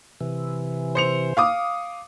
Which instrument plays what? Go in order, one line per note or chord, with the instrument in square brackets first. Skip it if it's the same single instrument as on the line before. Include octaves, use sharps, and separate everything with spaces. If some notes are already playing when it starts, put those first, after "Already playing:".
[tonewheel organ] C3 E3
[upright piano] C5 C#7 F7
F5 D6 D#6